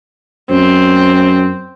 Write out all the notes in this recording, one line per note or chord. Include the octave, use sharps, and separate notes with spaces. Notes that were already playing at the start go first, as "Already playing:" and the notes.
F#2 C4